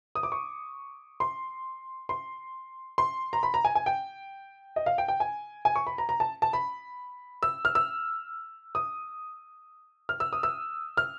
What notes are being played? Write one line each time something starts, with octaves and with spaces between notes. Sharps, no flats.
D#6
D6
C#6
C6
C6
C6
A#5
B5
A#5
G#5
G#5
G5
D#5
F5
G5
G5
G#5
G#5
C#6
B5
A#5
A#5
A5
A5
B5
E6
F6
E6
D#6
F6
E6
D#6
E6
F6